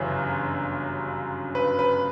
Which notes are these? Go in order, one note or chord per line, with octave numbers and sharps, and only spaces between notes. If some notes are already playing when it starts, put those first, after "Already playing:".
Already playing: G1 F#2 C#3 E3
B4
B4